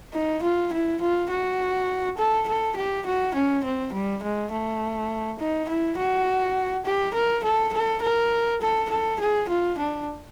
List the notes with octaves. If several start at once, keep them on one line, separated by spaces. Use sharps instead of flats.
D#4
F4
E4
F4
F#4
A4
A4
G4
F#4
C#4
C4
G3
G#3
A3
D#4
E4
F#4
G4
A#4
A4
A4
A#4
A4
A4
G#4
F4
D4